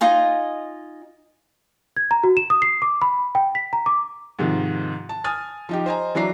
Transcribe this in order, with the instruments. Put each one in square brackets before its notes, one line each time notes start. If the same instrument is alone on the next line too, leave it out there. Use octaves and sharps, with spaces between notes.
[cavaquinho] D#4 F4 D#5 G#5
[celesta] G#6
A#5
F#4
E7
D#6
C7
D6
B5
G5
B6
A#5
D6
[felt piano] G#2 C3 D#3 F3
A5
G#5 D#6 F6 A6
F3 D#4 G4
C5 D#5 G#5 A#5
E3 F#3 D4 E5 A#5 C7